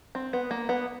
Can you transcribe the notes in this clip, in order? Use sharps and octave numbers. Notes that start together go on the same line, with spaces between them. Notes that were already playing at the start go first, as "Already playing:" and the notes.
C4
B3
A#3
B3